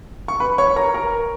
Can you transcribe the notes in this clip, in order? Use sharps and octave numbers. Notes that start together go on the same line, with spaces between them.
C#6
B4 B5
C#5 C#6
A#4 A#5
A#4 A#5